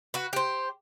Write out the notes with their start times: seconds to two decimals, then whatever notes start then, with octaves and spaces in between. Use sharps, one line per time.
0.14 F#4 B4
0.33 G4 C5